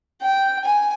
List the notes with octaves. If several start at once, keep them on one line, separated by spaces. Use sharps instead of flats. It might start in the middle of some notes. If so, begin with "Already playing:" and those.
G5
G#5